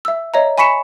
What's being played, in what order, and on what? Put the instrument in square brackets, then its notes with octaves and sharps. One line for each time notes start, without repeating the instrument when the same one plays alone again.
[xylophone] E5 E6
C#5 D#5 E5 A#5
G#5 B5 C#6 B6 C#7 E7